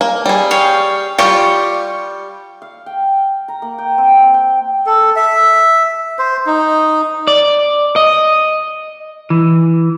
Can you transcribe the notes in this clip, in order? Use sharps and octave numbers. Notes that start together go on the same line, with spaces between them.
A#3
G3 G#4
C#5 F5 G5
G3 F4 G4 C#6
F5
G5
A#5
A#3
G5
C4
G5
A4
E5
C5
D#4
D5
D#5
E3